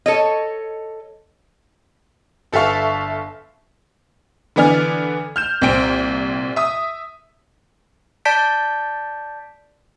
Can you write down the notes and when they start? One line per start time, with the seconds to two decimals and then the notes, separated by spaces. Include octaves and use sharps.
0.06 A4 C#5 D#5
2.53 G1 A4 E5 F5 C#6
4.56 D3 E3 B3 D5 G#5 F6
5.36 F6 G6 E7
5.62 C2 A#2 C4 G5 D7
6.56 E5 D#6
8.25 D5 A5 G6 B6 D7